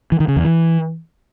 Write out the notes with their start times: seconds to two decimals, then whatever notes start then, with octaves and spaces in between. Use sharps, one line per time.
0.12 E3
0.20 D#3
0.28 C#3
0.36 E2
0.45 E3